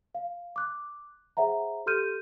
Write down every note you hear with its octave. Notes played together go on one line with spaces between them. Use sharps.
F5
D6 F#6
G#4 C5 E5 F#5 A#5
G4 A4 C6 F6 G6 D#7